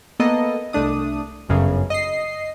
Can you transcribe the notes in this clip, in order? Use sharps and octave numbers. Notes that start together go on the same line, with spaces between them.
A#3 B3 A4 D#5
C2 A3 D4 D#6
G1 F#2 C#3
D#5 C7